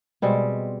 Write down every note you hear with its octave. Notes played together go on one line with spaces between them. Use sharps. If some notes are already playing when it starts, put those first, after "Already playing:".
B2 G3 G#3 C4